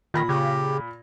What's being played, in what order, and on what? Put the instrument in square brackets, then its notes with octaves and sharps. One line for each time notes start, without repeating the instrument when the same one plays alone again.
[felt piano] A#2 B5 A#6 [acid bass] D#3
[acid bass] C#3 [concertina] G4